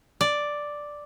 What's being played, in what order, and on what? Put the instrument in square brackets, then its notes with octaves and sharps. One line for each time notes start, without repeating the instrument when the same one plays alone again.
[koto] D5